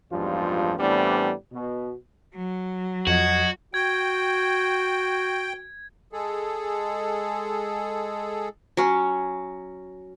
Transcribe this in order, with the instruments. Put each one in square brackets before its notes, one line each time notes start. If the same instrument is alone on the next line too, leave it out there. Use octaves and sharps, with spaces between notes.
[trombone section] A1 E2 G2 F3 G#3 F4
A2 E3 G3 B3 C4 D4
B2
[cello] F#3
[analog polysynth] F2 [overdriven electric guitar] F#4 [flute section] D#5 F#5 G#6
[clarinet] F#4 [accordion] G5 [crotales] G#6
[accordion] G#3 G#4 A4
[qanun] F#3 C#4